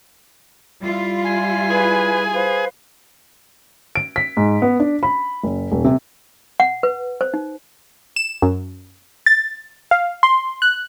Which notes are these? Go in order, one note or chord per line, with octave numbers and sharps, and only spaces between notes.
G3 E4 F4
G#5
G#4 B4
B4 C5 F5
D7
B6
G#2
B3
D4
B5
F#1
D#1
C3
F#5
B4
C5
D#4
E7
F#2
A6
F5
C6
F#6